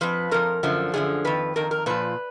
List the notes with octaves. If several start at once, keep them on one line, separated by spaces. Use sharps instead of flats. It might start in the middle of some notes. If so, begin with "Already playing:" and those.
F2 F3 B4
F2 F3 A#4
F#2 D3 F3
F#2 D3 F3 G#4
F2 D#3 B4
F2 D#3 A#4
A#4
A#2 F3 B4